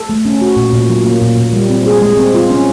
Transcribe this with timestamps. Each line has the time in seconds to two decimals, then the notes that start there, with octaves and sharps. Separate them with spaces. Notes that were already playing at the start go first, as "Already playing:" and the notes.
Already playing: A4
0.09 A3
0.25 C#4
0.41 F#4
0.56 A#2
0.72 A#2
0.90 F#3
1.05 A#3
1.21 A#2
1.37 A#2
1.53 G3
1.70 C4
1.86 G#4
2.02 G#3
2.17 C4
2.34 F4
2.50 C#4